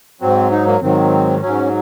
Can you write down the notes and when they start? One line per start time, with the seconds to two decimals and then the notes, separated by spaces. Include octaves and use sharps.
0.21 G#2 F#3 C4
0.51 D#4
0.66 A#3
0.81 G#2 D#3 F#3 C4
1.42 G#2 F#3 C#4